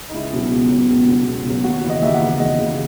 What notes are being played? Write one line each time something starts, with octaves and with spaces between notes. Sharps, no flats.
D#4
C#2 E4
B2 F#3
C#2
B2 F#3
C#2
B2 F#3
C#2
B2 F#3
D#2 F#4
C#3 E3
D#5
D#2 E5
F#5
C#3 E3
E5
D#2 D#5
C#3 E3